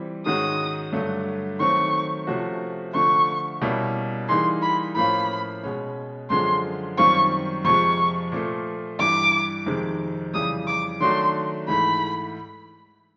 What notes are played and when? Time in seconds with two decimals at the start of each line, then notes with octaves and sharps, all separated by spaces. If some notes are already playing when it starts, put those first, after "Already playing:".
Already playing: E3 G3 C4 F4
0.26 G#2 D#3 G#3 C#4 F#4 D#6
0.92 G2 D3 F#3 A3
1.60 D#3 F#3 A3 C4 C#6
2.27 C3 F3 A3 C#4 F#4
2.94 D3 F3 A3 C#6
3.61 B2 G3 A#3 C#4 E4
4.29 E3 G3 A#3 D#4 G#4 C6
4.62 B5
4.96 A2 F3 A#3 C#4 F4 B5
5.63 B2 G#3 C#4
6.30 F#2 D3 F3 G#3 C6
6.98 F#2 D#3 G3 C4 F4 C#6
7.65 F2 C3 F3 G#3 C#6
8.32 A#2 F3 A3
8.99 G2 E3 G3 D6
9.66 F2 C3 D#3 G#3
10.34 F2 C#3 E3 G3 D#6
10.67 D6
11.01 D#3 F#3 A3 D4 F#4 C6
11.68 G#2 E3 A3 B5